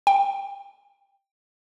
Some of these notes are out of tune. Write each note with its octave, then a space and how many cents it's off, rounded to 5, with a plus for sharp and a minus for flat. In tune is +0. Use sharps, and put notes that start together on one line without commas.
G5 +10